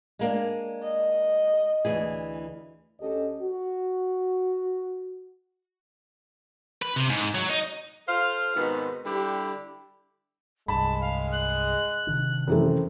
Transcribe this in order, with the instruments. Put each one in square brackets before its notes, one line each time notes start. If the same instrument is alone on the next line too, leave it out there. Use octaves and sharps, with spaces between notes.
[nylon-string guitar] G#3 A#3 D4
[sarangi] D#5
[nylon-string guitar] D2 E3 G#4
[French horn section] D2 C#4 G4 A4 D#5
F#4
[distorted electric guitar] B4
C3
G#2
F#3
D#4
[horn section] F4 A4 C5 F5
G#2 B2 D#3 B3 C4 F#4
D3 G3 E4 G4
[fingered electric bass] C2 G2 [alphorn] G#3 [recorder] A5 [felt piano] B5
[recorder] F5
F#6
[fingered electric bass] C3 D#3 D4
[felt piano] F#2 E3 A3 [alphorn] C4